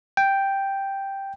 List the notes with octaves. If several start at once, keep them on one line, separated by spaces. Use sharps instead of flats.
G5